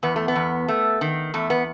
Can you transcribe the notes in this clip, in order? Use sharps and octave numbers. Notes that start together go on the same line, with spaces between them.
E2 B3
A3
B3
E2
A3
D#3
E2 A3
B3